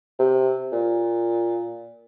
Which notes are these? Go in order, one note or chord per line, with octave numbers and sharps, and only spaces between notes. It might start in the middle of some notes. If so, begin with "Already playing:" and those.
C3
A#2